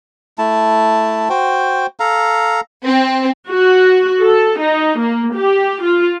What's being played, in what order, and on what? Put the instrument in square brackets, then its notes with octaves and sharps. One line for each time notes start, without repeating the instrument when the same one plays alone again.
[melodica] A3 E4 A5
F#4 C5 G5
A4 F5 A#5
[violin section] C4
[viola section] F#4
A4
D#4
A#3
G4
F4